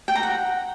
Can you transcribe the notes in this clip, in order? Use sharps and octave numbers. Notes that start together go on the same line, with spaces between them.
G5
A#5
F#5